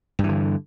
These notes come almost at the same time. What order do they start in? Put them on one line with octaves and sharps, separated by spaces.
G2 E3 D3